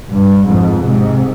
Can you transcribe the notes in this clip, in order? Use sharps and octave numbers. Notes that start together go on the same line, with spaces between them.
G2
F2 G#2
G#2 C3